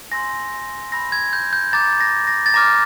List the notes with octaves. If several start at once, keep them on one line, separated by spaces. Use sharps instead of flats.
G#5 C6 E6 G6 A#6
B5 E6 G6 A#6
G#6
G6
G6
A#5 D6 G6 A6
A#6
A#6
A6
A#5 D6 F6 A#6